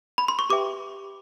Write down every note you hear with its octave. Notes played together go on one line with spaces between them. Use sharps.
B5
C6
C#6
G4 B4 E5 G5 D6